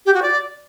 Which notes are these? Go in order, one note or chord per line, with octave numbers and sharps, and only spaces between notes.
G4
F#4
D5